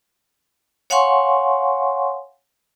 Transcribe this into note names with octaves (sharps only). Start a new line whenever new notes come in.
C#5 F5 F#5 G#5 C6 C#6